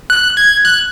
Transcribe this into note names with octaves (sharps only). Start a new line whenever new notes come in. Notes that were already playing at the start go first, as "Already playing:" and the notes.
F#6
G#6
F#6